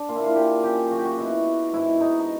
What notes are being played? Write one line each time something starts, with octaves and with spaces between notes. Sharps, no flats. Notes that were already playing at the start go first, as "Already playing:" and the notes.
Already playing: D4
A#2 F4
E4
F4
A#2 G4
C#3 G4
F#3 F#4
G4
F#4
B2 E4
B2
G#2 E4
G#2 D#4
D#4